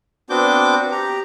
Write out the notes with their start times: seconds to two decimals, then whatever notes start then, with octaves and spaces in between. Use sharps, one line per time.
0.30 B3 C4 D4 F#4 D6 G6
0.91 G4 A#5